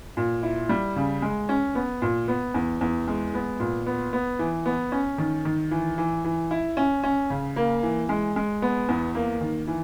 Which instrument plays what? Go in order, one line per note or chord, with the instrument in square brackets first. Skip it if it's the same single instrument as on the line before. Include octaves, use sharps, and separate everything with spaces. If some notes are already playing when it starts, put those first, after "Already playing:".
[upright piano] A#2
E4
G3
C#3
G#3
C#4
B3
A#2
B3
E2
E2
G#3
B3
A#2
B3
B3
E3
B3
C#4
D#3
D#3
E3
E3
E3
E4
C#4
C#4
C#3
A#3
E3
G#3
G#3
B3
E2
A#3
D#3
E3